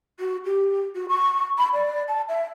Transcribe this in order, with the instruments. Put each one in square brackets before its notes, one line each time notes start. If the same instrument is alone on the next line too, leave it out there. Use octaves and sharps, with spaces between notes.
[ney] F#4
G4
F#4
C#6
B5
D5
A5
E5